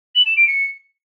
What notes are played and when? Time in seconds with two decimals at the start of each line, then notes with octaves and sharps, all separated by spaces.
0.15 F#7
0.25 E7
0.36 D7
0.47 C#7